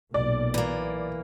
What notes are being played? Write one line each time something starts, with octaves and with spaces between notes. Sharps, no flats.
B1 A#2 D5
E3 A#3